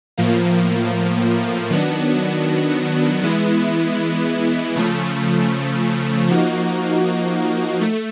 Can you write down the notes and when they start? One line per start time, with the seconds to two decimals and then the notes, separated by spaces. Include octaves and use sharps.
0.17 A2 F3 A#3
1.70 D#3 F#3 B3 D4 F#4
3.23 E3 G#3 B3 E4
4.76 C#3 F3 A3
6.29 F3 A#3 D#4 F#4
7.81 A3